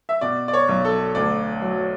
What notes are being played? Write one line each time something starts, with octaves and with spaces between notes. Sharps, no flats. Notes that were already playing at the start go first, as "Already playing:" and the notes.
E5
B2 D5
D5
C#5
B1
A4
D2 D5
F#3